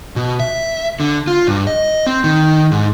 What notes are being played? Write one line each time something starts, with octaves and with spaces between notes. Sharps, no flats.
B2
E5
D3
F4
G2
D#5
C4
D#3
G#2